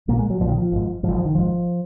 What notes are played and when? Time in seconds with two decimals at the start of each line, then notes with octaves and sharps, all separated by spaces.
0.08 B1 A#2 A#3
0.19 G#3
0.30 F#3
0.40 B1 A#2 F3
0.49 D#3
0.58 F3
0.72 G#1 G#2
1.03 G#2 F3
1.08 G#1
1.15 F3
1.25 D#3
1.35 G#1 G#2 F3